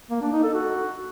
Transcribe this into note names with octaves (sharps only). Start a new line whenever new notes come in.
A#3
D4
D#4
A4
F#4